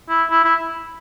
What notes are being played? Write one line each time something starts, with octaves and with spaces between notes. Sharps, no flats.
E4
E4
E4